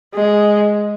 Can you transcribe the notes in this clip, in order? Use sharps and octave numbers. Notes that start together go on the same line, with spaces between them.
G#3